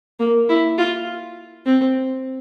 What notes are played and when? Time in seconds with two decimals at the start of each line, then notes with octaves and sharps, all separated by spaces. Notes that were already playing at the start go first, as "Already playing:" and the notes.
0.20 A#3
0.49 E4
0.78 F4
1.66 C4